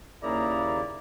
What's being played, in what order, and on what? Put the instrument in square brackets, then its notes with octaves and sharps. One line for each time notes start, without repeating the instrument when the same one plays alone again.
[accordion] D#2 C#3 [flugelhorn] E4 [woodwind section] G#4 A#4 A#5 [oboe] D5